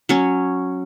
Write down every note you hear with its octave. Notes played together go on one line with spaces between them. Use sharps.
F#3 C#4